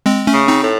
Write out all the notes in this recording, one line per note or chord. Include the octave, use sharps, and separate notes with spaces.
G#3 C4
A3 C#4
C#3
C4 D#4
A2